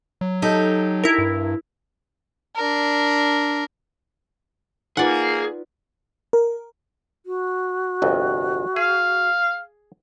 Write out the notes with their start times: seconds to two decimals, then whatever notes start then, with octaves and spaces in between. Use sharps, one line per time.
0.21 F#3
0.42 D#4 G4 A4
1.04 E4 A#4
1.18 G2
2.56 D4 A#4
4.97 A#3 D#4 F4 G#4 B4 D5 F#5
6.33 A#4
7.26 F#4
8.02 G1 C2 F2
8.76 G#4 F5